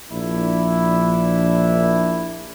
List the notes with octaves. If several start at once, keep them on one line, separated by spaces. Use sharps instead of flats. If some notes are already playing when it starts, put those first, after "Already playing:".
A#1 D4 E4